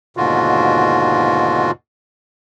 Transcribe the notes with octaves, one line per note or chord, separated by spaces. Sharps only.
D#2 G#2 B2 D3 F4 F#4